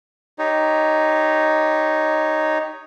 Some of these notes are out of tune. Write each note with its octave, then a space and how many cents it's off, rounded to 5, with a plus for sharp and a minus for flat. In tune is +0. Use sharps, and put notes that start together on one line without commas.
D#4 +0 G4 +0 C#5 +0